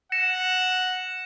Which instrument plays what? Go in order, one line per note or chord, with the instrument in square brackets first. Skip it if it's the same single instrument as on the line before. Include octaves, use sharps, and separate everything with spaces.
[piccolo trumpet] F#5 [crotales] A#6 C#7 E7